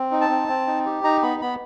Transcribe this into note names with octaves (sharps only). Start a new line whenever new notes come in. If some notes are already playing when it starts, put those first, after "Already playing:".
Already playing: C4
D#4
A5
C4
C4
D#4
G4
D#4 A#5
B3 B5
B3 B5